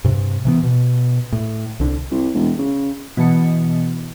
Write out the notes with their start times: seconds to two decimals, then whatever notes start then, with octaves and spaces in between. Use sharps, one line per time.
0.04 G2 C3
0.45 C3 E3 B3
0.63 B2
1.32 A2
1.80 C2 D3
2.11 C2
2.35 E1
2.59 C#3
3.17 B2 E3 A5 C#7